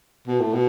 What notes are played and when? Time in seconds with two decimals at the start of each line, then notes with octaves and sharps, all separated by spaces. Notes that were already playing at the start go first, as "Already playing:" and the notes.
0.28 B2
0.40 A2
0.54 B2